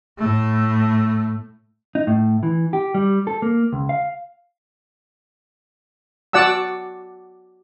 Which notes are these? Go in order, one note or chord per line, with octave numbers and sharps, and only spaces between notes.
A2 A3
D#4
A2
E3
G4
G3
A4
A#3
C#2
F5
F#4 D5 F#5 A5 E6